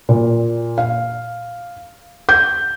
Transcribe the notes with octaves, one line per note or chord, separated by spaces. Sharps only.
A#2
F5
G6